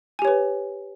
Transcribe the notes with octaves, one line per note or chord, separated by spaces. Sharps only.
G4 B4 C#5 G#5